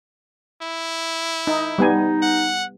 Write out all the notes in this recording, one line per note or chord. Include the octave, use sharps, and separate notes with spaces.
E4
D#4
G3 B3 D#4 G#5
F#5